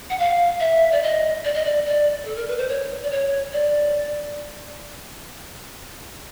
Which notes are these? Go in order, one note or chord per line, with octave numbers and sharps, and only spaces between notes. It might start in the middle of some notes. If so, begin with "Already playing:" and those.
F#5
F5
E5
D5
D#5
D5
D#5
D5
D5
A4
A#4
B4
C5
C#5
D5
C#5
D5